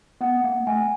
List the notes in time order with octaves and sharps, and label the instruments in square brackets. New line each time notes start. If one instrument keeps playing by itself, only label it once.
[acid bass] B3 [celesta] F#5
[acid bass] A#3
[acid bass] A3 [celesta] G#5